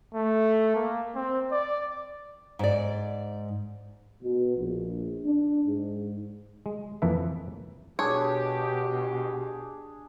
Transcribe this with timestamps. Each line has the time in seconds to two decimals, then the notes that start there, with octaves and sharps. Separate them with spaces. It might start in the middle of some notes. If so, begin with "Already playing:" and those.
0.14 A3
0.75 A#3
1.15 C4
1.51 D5
2.59 G#2 D5
4.22 B2
4.57 A#1
5.26 D4
5.66 G#2
6.66 G#3
7.02 F2 E3 A#3 A4 B4 E5
7.99 B2 D4 G4 G#4 C#5